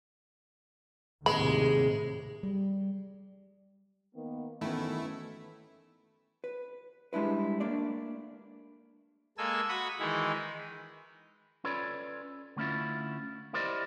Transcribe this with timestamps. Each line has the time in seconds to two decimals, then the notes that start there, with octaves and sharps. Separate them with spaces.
1.26 D#2 A2 C3 G#3 B5
2.43 G3
4.14 D#3 A#3 B3
4.61 F#2 D#3 E3 A3 B3 C#4 E4
6.44 B4
7.13 G3 G#3 D4 E4 B4
7.60 A3 A#3 D4 D5
9.38 G#3 A#3 A4 G#5 E6
9.69 F#4 B5 C#6 D#6
10.00 D#3 E3 G#3 D#4 E4
11.64 C#4 F4 A4 B4 C#5 D5
12.56 D3 A3 C#4 E4 F4
13.53 E4 G4 A#4 C5 D5 D#5